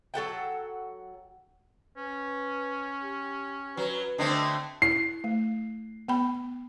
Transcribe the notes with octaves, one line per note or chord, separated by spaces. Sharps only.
F#3 A4 F#5 G5
C#4 B4
G4
F#3 B4
D3 A3 C4 D#5
E4 C7
A3
B3 G5 B5